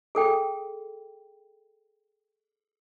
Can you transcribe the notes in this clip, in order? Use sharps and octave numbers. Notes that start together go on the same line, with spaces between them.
G#4 A4 G5